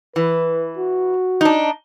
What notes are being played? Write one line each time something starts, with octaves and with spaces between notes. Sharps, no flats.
E3 B4
F#4
D4 D#4